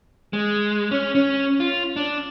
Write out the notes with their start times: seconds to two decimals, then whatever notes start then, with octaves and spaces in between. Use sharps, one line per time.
0.33 G#3
0.91 C#4
1.15 C#4
1.60 F4
1.96 D4